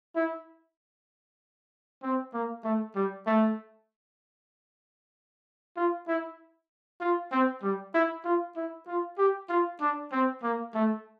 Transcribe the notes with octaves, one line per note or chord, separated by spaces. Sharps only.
E4
C4
A#3
A3
G3
A3
F4
E4
F4
C4
G3
E4
F4
E4
F4
G4
F4
D4
C4
A#3
A3